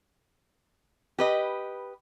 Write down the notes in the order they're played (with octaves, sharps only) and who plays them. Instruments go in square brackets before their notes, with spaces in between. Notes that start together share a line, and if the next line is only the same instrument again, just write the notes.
[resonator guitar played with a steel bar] G4 B4 D#5